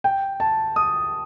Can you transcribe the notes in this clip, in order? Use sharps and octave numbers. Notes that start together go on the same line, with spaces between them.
G5
A5
D#6